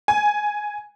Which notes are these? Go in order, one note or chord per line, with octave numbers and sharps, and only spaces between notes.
G#5